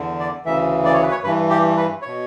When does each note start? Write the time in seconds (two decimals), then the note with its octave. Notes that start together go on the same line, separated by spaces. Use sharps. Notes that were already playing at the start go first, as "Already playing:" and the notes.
Already playing: E2 D3
0.20 D5
0.45 D2 C#3 E3 E5
0.85 D5
0.94 C#5
1.03 B4
1.11 C#5
1.24 G2 E3 B4
1.50 G4
1.77 B4
2.02 B2 C#5